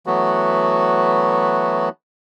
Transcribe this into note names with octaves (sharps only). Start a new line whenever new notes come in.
E3 F#3 A3 B3 F#4